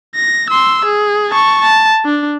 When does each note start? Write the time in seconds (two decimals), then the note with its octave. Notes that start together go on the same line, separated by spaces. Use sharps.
0.15 A#6
0.49 C6 E6
0.85 G#4
1.30 A5 C#6
1.61 A5
2.05 D4